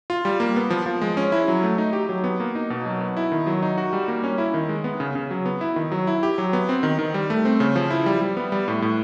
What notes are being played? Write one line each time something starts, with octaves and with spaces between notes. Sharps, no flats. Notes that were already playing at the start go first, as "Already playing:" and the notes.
F4
G3
A#3
B3
F3
F3
G#3
C#4
E4
F#3
A3
D#4
G4
F#3
B3
A#3
D#4
B2
F#3
B3
E4
D#3
F#3
D#4
F#4
G3
A#3
C#4
E4
D#3
G#3
B3
C#3
C#3
F#3
B3
E4
D#3
F#3
E4
G4
F#3
B3
C4
D#3
D#3
G3
A3
C4
C#3
F3
E4
G3
G3
B3
G3
A2
A2